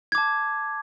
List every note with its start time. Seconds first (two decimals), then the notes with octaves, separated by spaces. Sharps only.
0.12 G#6
0.15 D6
0.18 A5